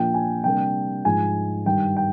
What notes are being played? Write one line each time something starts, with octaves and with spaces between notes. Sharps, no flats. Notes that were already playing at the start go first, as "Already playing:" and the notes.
Already playing: A#2 F3 A#3 D4 G5
G#5
C3 G3 A#3 D4 G5
G#2 F3 G#3 G#5
G2 D#3 G3 G5
G5